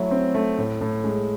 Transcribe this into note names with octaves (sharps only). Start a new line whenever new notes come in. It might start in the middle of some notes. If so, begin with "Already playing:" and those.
Already playing: F#3 A3 E4
C4
A3
A2
A2
G#3